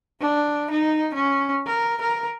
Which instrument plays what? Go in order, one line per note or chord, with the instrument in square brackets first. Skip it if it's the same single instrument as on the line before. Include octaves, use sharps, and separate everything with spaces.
[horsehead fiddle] D4
D#4
C#4
A#4
A#4